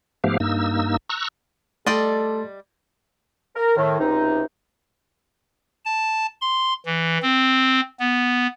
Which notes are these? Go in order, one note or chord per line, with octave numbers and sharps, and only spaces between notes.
G#2 F3 A3 B3 G4 F5
G2 A#3 D#4 E6
A#5 C#6 E6 F#6
G3 A3 A4 D5 D#5 C6 A6
A#4
A2 D#3
C#2 C3 D#4
A5
C6
E3
C4
B3